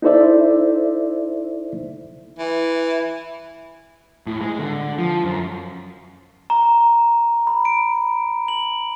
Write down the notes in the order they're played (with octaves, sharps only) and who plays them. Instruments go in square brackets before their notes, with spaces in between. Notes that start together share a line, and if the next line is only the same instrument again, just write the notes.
[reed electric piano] D#4 E4 A4 C5 D5 E5
[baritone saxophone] E3 [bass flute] E5
[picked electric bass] A2
G#3
D3
F3
F#2
[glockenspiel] A#5
B5
D7
F#7